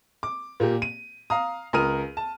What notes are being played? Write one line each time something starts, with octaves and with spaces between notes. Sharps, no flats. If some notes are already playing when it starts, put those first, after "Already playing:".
D6
A#2 A#3 G4
D#7
F5 A#5 D#6
C#2 A#4 D#6 F6 D#7
A5